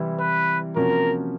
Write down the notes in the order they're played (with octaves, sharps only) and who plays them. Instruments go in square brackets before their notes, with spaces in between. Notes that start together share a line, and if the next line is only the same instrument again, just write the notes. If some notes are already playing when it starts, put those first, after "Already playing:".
Already playing: [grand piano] C3 E3 G3 C4 E4
[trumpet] B4
[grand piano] C3 F3 A#3 C#4 F#4 [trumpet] A#4